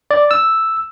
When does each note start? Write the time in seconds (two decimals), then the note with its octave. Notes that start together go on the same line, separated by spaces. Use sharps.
0.11 D5
0.31 E6